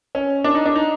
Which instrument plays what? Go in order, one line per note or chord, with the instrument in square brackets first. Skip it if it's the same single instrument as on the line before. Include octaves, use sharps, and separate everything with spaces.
[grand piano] C#4
D4
D#4
D4
D#4